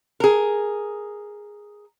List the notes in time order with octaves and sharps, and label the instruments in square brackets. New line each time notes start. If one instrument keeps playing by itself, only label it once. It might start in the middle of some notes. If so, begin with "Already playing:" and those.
[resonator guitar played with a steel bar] G#4 A#4